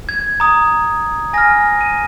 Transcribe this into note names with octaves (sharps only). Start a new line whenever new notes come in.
G#6
A#5 D#6
G#5 F6 A#6
D#7